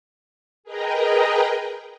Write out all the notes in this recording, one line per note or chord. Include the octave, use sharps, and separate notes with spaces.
G#4 A#4 B4 D#5 G5 A#5